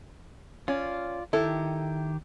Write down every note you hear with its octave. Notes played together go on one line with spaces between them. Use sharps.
C#4 F4 D5
D#3 E4 G4 A4